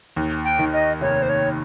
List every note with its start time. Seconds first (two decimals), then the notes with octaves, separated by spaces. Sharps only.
0.16 D#2
0.45 G5
0.59 D#3
0.73 D#5
1.01 F1 C#5
1.22 C5
1.29 C#5